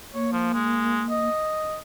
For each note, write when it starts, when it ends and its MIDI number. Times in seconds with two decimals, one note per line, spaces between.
0.14 1.29 58
0.14 0.30 73
0.32 0.50 53
0.54 1.03 56
1.10 1.78 75